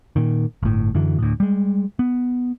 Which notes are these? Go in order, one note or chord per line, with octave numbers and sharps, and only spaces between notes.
A#2 D#3
G1 A2
F#2 D3 E3 F#3
D2 A2
G3 G#3
B3